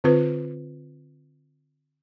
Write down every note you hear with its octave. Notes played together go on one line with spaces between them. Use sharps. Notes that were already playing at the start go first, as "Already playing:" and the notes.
D3 C4 F4 B4